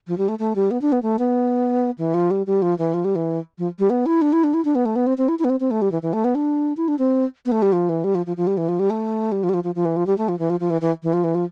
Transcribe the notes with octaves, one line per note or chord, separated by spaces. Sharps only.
F3
G3
A3
A3
G3
B3
D4
B3
A3
B3
E3
F3
G3
G3
F3
E3
F3
G3
E3
F3
G3
B3
E4
D4
E4
D4
E4
D4
B3
A3
B3
C4
C4
E4
E4
B3
C4
C4
A3
G3
E3
E3
A3
B3
D4
E4
D4
C4
B3
A3
G3
F3
E3
G3
F3
F3
F3
G3
E3
F3
G3
A3
G3
F3
G3
F3
F3
F3
E3
F3
G3
A3
F3
E3
F3
F3
E3
E3
E3
F3
E3
F3